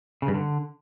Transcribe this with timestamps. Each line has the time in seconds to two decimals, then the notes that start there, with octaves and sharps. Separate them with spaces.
0.22 C#3
0.28 G2
0.34 D3